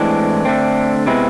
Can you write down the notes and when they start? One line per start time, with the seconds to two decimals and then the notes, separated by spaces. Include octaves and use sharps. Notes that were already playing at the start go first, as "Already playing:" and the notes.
Already playing: A2 E3 G#3 C4 D4
0.45 D3 A3 C4
1.06 C3 G#3 B3 C4 E4